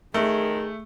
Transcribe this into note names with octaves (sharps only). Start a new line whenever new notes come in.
D#3 A3 G#4